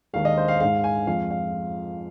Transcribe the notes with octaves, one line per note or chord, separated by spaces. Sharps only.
D#2 D#3 G#3 F5
D#5
C5
F5
G#2 G#3 F5
G#5
F2 F3 G#3 F5
F5